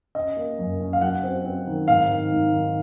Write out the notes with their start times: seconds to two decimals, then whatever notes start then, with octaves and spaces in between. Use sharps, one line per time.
0.15 C#4 D#5
0.37 A#3
0.59 F#2
0.80 C#4
0.93 F5
1.01 F#3 F#5
1.23 C4
1.45 C4
1.67 D#3
1.88 G#2 F5
2.09 D#3
2.32 G#2
2.54 D#3